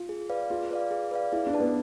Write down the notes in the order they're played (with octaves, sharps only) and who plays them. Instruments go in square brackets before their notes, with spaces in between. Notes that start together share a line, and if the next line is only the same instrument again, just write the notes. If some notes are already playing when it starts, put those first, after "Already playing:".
Already playing: [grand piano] F4
[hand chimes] G#4
B4 D5 F5
[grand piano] F4 [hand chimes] G#4
[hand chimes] B4 D5 F5
G#4
B4 D5 F5
[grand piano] E4 [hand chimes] G#4
[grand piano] D4
[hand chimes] B4 D5 A5
[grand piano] B3